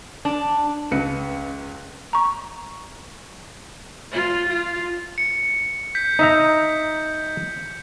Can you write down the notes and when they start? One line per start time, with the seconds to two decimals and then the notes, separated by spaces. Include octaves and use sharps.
0.25 D4
0.91 C#2 B4 C#7
2.13 A#5 C#6
4.12 F4
4.50 F4
5.18 C#7
5.95 G6 B6
6.19 D#4 E5 A#5